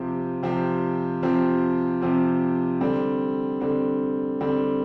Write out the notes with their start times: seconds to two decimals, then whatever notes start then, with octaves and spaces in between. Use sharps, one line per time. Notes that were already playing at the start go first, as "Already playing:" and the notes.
Already playing: C3 F3 C4 G4
0.43 C3 F3 C4 G4
1.22 C3 F3 C4 G4
2.02 C3 F3 C4 G4
2.81 D3 G3 C4
3.61 D3 G3 C4
4.40 D3 G3 C4